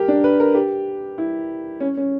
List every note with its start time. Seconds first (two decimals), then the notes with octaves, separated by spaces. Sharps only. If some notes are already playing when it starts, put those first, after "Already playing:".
Already playing: G4 A#4
0.08 D4
0.24 B4
0.40 A#4
0.55 G4
1.18 E4
1.80 C#4
1.97 C#4